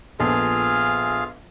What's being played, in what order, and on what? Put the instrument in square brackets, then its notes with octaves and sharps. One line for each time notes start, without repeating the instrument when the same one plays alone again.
[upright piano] A#1 B3 A4 [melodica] F4 G#4 F5